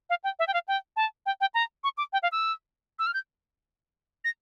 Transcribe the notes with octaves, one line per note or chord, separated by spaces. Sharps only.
F5
G5
E5
G5
F5
G5
A5
G5
G5
A#5
C#6
D6
G5
F5
E6
E6
F6
G6
A#6